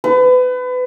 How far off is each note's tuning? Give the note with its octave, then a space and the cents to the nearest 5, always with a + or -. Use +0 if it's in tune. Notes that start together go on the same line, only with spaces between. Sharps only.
B4 +30